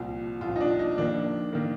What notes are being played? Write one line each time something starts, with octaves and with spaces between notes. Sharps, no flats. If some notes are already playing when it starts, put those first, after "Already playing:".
Already playing: C2 A#2 F3
C2 A#2 F3 F4
D#4
D4
D#4
F2 D#3 A#3 D4
D#3 A#3